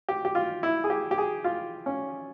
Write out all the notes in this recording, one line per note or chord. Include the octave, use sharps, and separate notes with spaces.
G4
G4
F4
E4
G#4
G4
G4
G#4
F4
C#4